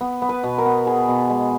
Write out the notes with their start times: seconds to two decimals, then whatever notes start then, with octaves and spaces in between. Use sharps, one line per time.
0.01 B3
0.22 B3
0.29 B4
0.44 B2
0.58 A#4
0.65 B3
0.87 B3 G#4
1.09 B2
1.30 G#3